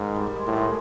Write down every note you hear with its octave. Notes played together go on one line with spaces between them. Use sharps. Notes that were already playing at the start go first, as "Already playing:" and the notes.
Already playing: G#2 D#3
G3
G3
G#3
A2 G3
G#3